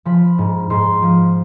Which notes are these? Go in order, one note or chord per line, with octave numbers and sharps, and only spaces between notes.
F3 B5
G#2
G#2 C6
F3